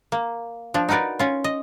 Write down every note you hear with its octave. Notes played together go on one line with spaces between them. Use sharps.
A#3
F3 D4
D#4 F#4 A#4 B4 D5
C#4 F4
D#5